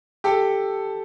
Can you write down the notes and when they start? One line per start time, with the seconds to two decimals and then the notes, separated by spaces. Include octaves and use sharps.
0.24 G4 A4